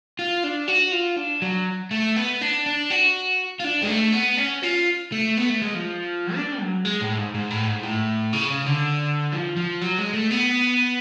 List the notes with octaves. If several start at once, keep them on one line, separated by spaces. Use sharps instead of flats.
F4
D4
F#4
F4
D4
F#3
A3
B3
D4
D4
F#4
F4
D4
G#3
A3
B3
C#4
F4
A3
B3
A3
G#3
F3
D4
F#3
G#3
A2
G#2
G#2
A2
G#2
A2
C#3
C#3
D3
F3
F3
F#3
G#3
A3
B3